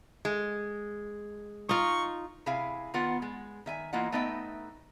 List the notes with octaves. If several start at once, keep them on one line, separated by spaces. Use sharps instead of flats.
G#3
D#4 F4 C#6
C3 E4 G#4 E5 F5 G#5
D#3 B3 F4 F#5
G#3
D#3 E5 G#5
E3 A#3 E4 F4 D#5 F#5
A3 B3 D#4 D#5 E5 G5